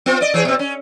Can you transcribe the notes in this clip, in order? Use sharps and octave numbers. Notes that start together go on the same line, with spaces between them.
B3 F4
D5 D#5
E3 G#4 C#5
B2 C4
C#4